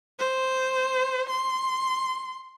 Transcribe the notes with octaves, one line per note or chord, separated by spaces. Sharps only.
C5
C6